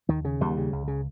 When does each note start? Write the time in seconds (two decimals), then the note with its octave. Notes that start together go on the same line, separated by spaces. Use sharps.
0.09 D#2 D#3
0.25 C#3
0.41 D#2 G3
0.57 C#3
0.72 C#2
0.88 C#3